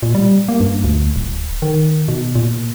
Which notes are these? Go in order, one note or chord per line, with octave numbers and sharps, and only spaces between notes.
A#2
G3
A#3
G2
D2
D1
D#3
B2
A#2